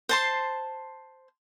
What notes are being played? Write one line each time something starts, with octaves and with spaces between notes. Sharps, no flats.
C5 A5 C6